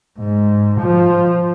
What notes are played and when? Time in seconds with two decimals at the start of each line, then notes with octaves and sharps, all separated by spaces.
0.19 G#2
0.80 F3